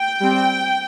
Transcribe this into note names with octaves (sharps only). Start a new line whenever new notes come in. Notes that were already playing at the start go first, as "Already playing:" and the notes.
Already playing: G5
G3 C4